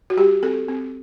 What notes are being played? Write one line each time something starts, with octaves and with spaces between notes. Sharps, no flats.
F#4
G3 G4
C4 A4
C4